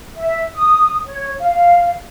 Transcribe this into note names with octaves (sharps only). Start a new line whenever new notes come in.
E5
D#6
C#5
F5